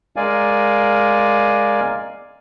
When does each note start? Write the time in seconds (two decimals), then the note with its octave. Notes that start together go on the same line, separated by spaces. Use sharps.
0.16 G#3 A#4 D5 F5 G#5